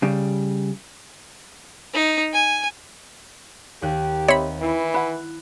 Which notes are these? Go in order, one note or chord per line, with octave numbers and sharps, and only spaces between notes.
C#3 G3
D#4
G#5
D#2 G4 F#6
C4 C#5 D#5 E5 B5
E3 E4
E4 F#5 F#6